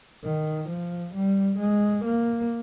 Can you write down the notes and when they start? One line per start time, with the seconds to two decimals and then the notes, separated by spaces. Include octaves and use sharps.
0.24 D#3
0.70 F3
1.15 G3
1.60 G#3
2.05 A#3